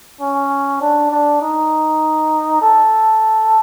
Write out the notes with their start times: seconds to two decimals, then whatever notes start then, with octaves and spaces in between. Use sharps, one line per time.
0.21 C#4
0.81 D4
1.12 D4
1.41 D#4
2.62 A4